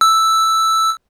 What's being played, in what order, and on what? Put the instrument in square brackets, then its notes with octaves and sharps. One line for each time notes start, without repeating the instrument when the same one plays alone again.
[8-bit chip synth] E6